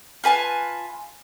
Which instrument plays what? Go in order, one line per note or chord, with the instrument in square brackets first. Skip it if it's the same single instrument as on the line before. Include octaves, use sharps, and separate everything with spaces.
[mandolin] F4 B4 G#5 A5